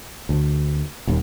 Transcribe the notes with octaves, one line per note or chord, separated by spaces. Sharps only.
D2
D#1 D#2